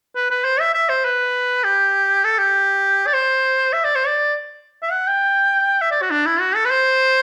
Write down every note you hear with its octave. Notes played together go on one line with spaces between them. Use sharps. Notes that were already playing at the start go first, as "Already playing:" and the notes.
B4
B4
C5
E5
E5
C5
B4
G4
A4
G4
D5
C5
E5
D5
C5
D5
E5
F#5
G5
E5
D5
F#4
D4
E4
F#4
A4
B4
C5